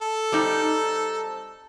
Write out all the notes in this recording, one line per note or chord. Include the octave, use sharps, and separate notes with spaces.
A4
G3 C4 D#4